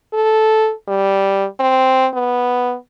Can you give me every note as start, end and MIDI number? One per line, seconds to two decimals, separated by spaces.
0.14 0.72 69
0.88 1.46 55
1.60 2.08 60
2.14 2.75 59